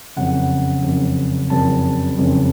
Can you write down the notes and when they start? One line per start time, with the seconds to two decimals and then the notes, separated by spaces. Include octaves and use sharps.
0.16 F#1 F2 C#3 F#5
0.83 F#1 F2 C#3
1.50 F#1 F2 C#3 A5
2.18 F#1 F2 C#3